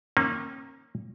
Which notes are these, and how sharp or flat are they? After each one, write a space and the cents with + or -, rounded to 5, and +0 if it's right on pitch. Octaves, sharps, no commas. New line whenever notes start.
D#3 +0 A#3 -10 C#4 -40